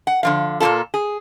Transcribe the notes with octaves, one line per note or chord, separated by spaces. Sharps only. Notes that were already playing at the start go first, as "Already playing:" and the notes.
F#5
D3 F3 F5
A#2 A#3 B3 F4 A4
G#4